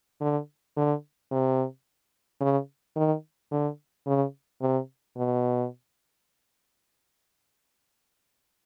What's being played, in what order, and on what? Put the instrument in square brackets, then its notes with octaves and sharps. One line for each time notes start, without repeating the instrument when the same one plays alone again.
[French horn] D3
D3
C3
C#3
D#3
D3
C#3
C3
B2